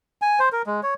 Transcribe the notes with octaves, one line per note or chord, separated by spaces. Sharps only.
G#5
C5
A#4
G#3
C#5